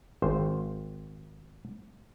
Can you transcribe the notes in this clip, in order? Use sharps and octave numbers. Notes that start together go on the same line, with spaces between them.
G#1 C5